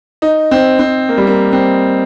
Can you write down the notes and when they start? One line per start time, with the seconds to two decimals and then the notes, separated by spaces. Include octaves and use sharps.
0.22 D#4
0.51 C4
0.79 C4
1.09 A#3
1.17 G3
1.27 A#3
1.52 C4